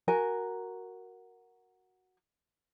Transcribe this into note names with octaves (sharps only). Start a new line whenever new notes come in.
F#4 A#4 G#5